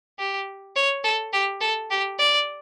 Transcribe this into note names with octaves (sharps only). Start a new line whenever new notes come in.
G4
C#5
A4
G4
A4
G4
D5